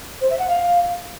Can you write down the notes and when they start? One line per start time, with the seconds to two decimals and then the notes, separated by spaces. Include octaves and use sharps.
0.21 C5
0.30 E5
0.39 F#5
0.48 F5